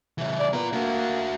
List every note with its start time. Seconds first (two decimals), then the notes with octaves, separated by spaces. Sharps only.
0.18 C#3 E3
0.40 D5
0.53 B3 F4 A#4
0.73 A#3 D4 F#4